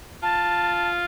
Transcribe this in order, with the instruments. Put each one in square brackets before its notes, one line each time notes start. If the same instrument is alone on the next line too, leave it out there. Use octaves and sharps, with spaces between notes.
[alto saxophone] F4 [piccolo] A5